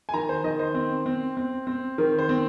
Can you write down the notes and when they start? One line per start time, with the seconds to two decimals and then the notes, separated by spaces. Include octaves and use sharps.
0.09 G#5
0.13 D#3 A#5
0.29 C5
0.44 D#3 D#5
0.59 C5
0.74 C4
1.06 C4
1.37 C4
1.67 C4
1.98 D#3 A#4
2.18 C5
2.29 C4